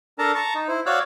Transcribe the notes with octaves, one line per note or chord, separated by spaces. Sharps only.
D4 A4 A#4 A5 A#5
A5 A#5 C#6
D#4
E4 C5
F#4 C#5 D5 F5 E6 F#6